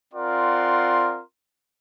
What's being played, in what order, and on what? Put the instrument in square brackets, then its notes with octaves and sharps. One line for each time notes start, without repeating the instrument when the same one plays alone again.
[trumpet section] C4 F4 A#4 D5 F#5 C6